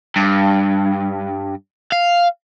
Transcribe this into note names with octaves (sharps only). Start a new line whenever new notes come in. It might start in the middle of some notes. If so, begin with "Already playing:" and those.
G2
F5